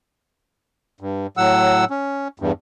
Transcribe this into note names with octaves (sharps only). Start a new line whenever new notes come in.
G2
A2 F#3 F#5 E6
C#4
E2 G2